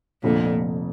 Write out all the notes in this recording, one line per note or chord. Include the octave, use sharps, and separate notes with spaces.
F1 F2 A#2 D3